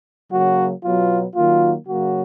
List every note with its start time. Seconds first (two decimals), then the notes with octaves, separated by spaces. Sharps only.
0.30 C#3 F#3 A#3 F#4
0.82 B2 F#3 B3 F4
1.35 D#3 F#3 A#3 F4
1.87 C#3 F#3 A#3 F#4